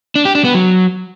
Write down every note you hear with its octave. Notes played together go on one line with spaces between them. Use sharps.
D4
G4
D4
B3
F#3